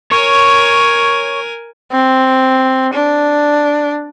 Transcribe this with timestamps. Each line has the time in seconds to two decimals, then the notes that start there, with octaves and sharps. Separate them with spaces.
0.11 A#4 C#5 G#5
1.92 C4
2.93 D4